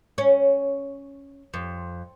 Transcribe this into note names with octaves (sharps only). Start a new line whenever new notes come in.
C#4
F2